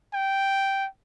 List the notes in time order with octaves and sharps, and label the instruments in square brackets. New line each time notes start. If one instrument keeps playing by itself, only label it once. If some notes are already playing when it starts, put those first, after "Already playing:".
[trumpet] G5